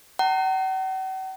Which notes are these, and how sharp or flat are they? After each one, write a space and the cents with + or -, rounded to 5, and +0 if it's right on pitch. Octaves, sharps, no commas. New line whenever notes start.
F#5 +45 A#5 -35